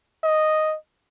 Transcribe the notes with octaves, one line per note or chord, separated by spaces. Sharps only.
D#5